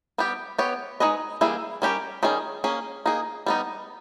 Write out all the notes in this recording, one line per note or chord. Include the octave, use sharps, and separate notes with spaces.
G3 B3 G4
B3 G4 C#5
G#3 D#4 G#4 B4 D#5
E3 G3 A#3 E4 G#4
G3 C#4 G4 A#4
D#3 G3 C#4 G#4
A#3 C#4 G#4
A#3 D#4 G#4
G3 B3 D#4